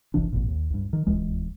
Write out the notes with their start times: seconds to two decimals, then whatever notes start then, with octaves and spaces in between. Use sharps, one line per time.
0.14 F#1 C2 E3 D4
0.32 G#1 F2 A#2
0.48 D#2
0.70 C#2 G2
0.93 D#3
1.07 D1 C#2 E3 G#3